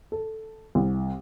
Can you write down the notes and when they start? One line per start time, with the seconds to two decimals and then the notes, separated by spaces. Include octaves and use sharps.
0.12 A4
0.75 C2